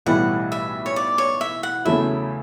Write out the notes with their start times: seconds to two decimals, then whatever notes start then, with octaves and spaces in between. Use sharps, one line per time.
0.06 B1 A2 E3 G3 F#5
0.52 E5
0.86 C#5
0.96 D5
1.18 C#5
1.41 E5
1.63 F#5
1.85 E2 C#3 F#3 A3 E4 E5